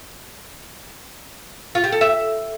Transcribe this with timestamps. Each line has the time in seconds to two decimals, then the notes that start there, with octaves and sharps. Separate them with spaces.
1.75 F4
1.84 G4
1.92 A4
2.01 E5